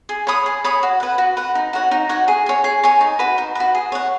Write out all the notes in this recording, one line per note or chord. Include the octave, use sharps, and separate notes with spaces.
G#4
C#5 B5 D#6
G#4
C#5 B5 D#6
F#4
B4 F#5
F#4
B4 F#5
D#4
F#4 C#5 F#5
D#4
F#4 C#5 F#5
G#4
C#5 G#5
G#4
C#5 G#5
D#4
F#4 B4
D#4
F#4 B4
G#4
C#5 F#5